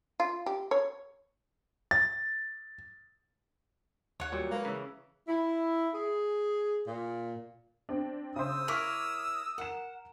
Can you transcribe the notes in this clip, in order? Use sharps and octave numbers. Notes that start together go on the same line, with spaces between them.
F4
G4
C#5
A6
D#2 C#5 F#5
A#2 F#3 G3
G#3 A#3 B4
C#3 E3
E4
G#4
A#2
C4 D4
C#3 C5 D#6 E6
E4 A#4 C#5 D6 F6
A#4 F#5 E7